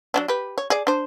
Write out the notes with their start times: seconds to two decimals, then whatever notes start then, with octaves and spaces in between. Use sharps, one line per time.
0.14 F#3 C#4 D4
0.28 G4 B4
0.58 C#5
0.70 G#4 D5
0.87 D4 C5